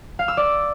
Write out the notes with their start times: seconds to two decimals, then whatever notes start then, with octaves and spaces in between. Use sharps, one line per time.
0.19 F5
0.28 E6
0.37 D5